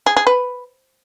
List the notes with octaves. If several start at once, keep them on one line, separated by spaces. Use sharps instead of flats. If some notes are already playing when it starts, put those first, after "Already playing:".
G#4
G#4
B4